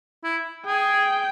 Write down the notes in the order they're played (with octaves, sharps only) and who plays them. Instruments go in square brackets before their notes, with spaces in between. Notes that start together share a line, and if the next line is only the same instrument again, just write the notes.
[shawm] E4
[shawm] G#4 [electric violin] G5